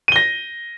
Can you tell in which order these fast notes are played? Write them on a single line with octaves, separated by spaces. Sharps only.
D#7 G7 A#6